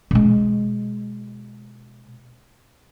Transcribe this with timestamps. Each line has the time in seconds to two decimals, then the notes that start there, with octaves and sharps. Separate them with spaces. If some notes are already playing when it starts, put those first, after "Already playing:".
0.11 B2 G#3